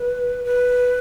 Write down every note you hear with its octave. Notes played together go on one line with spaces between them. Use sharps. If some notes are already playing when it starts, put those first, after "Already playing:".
Already playing: B4
B4